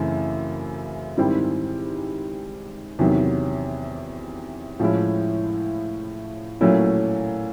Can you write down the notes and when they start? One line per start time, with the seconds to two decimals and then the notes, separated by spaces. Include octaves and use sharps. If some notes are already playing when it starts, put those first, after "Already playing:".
Already playing: F#2 C#3 E3 A3 C4
1.17 G#2 D#3 G3 C4 E4
2.99 E2 C3 D#3 F#3
4.80 A2 F3 G#3 C#4 E4
6.61 A#2 F#3 A3 C#4 E4